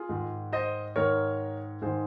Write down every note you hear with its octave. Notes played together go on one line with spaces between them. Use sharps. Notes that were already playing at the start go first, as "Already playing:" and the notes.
Already playing: F4 G#4
G#2 D#3
C5 D#5
G#2 D#3 A#4 C#5
G#2 D#3 G#4 C5